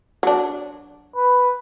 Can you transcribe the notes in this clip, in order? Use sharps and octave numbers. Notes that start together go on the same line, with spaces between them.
F#3 D4
B4